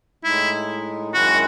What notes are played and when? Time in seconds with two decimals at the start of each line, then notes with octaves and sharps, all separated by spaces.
0.24 A2 G#3 D#4 E4
1.13 F#2 D#3 G#3 C#4 E4 F#4